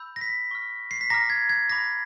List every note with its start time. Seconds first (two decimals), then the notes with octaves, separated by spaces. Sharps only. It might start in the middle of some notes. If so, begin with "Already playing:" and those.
Already playing: B5 E6 G6
0.16 A#6
0.21 B6
0.51 C#6 F6
0.91 C7
1.01 B6
1.10 A#5 D6 F6 A#6
1.30 G#6
1.49 G#6
1.70 B5 D6 F6 A#6